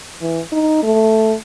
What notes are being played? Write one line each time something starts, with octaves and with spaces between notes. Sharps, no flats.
E3
D#4
A3